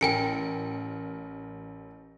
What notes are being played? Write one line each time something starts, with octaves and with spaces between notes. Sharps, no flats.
A1 A#4 G5 G#5 C#7